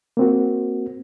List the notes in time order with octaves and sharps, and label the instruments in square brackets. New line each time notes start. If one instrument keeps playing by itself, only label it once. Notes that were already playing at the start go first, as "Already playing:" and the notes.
[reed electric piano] A#3 C4 F#4